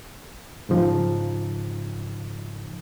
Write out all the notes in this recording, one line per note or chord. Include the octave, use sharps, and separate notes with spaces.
G#2 C#3 F3 D#4